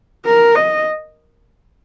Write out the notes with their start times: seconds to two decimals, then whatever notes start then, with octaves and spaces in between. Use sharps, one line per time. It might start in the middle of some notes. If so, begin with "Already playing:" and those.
0.25 A#4
0.55 D#5